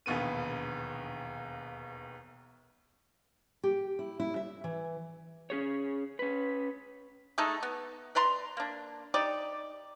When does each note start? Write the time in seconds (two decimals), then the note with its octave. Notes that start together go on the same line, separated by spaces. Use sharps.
0.06 E1 A#1 D#2 B3 D#7
3.63 G4
3.99 E4
4.20 E4
4.36 E5
4.64 E3
5.50 C#4 G#4 C#5
6.19 C#4 B4
7.38 G#3 A3 D#4 A4
7.63 B3
8.15 B4 D5 A#5 C6
8.57 A#3 D4
9.14 D#4 G4 D5